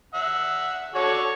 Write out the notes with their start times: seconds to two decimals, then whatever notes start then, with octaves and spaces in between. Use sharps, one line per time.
0.14 E5 F#5
0.95 F#4 A4 C#5 D5